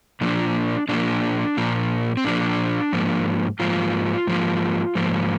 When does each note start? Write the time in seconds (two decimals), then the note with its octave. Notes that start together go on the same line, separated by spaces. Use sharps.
0.21 A#2 F3 A#3 D4
0.89 A#2 F3 A#3 D4
1.57 A#2 F3 A#3
2.17 C4
2.25 A#2 F3 A#3 D4
2.93 G#2 F3 A#3
3.60 G#2 F3 A#3 F4
4.27 G#2 F3 A#3
4.95 G#2 F3 A#3